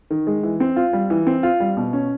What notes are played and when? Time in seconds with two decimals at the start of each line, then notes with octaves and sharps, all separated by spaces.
0.10 D#3
0.27 G#3
0.43 E3
0.60 C4
0.76 F4
0.93 G3
1.10 E3
1.27 C4
1.43 F4
1.60 G3
1.77 B2
1.93 C#4